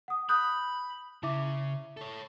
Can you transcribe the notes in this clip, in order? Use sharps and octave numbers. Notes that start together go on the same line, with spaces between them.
F#5 D#6
B5 D#6 F#6 G6
C#3 E4 E5 D6
A4 C#5